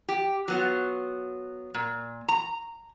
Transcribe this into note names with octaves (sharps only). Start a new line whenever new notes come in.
G4
F#3 B3 F4
A#2
A#5